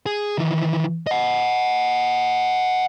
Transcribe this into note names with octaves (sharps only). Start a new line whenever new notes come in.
G#4
D#3 E3
D#5 F#5